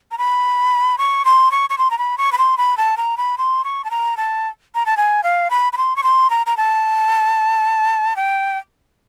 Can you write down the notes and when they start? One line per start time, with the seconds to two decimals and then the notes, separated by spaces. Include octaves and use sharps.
0.11 A#5
0.18 B5
0.98 C#6
1.25 C6
1.51 C#6
1.70 C#6
1.78 C6
1.91 A#5
1.98 B5
2.18 C#6
2.32 B5
2.38 C6
2.58 B5
2.77 A5
2.97 A#5
3.18 B5
3.38 C6
3.64 C#6
3.84 A5
3.91 A#5
4.17 A5
4.75 A#5
4.86 A5
4.97 G#5
5.23 F5
5.50 B5
5.73 B5
5.77 C6
5.96 C#6
6.03 C6
6.30 A#5
6.46 A#5
6.57 A5
8.16 G5